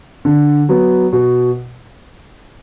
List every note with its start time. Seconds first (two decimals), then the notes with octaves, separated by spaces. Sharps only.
0.25 D3
0.69 F#3 B3
1.13 B2